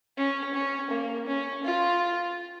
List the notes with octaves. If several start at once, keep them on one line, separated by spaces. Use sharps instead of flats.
C#4
C#4
A#3
C#4
F4